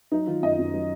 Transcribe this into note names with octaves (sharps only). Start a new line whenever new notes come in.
F#3 D#4
D#3 F4
F#2 D#5
F#2
F#3